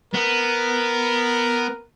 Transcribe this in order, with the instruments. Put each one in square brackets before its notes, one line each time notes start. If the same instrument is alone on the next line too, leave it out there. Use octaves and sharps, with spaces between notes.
[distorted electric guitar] B3 [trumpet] A#4